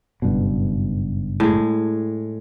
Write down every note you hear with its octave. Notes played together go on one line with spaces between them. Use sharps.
F#1 G2 B2
A2 G#3